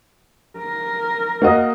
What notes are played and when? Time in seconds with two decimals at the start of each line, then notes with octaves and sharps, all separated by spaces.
0.58 A#4
1.42 A#3 F#4 D#5